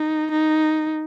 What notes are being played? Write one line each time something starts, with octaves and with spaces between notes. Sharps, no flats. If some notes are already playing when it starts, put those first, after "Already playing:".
Already playing: D#4
D#4